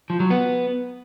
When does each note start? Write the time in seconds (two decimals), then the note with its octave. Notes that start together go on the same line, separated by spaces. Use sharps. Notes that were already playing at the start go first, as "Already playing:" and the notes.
0.10 F3
0.20 F#3
0.30 B3